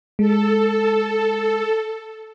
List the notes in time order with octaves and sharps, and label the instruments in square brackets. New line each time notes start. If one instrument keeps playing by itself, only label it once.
[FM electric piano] G#3 [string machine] A4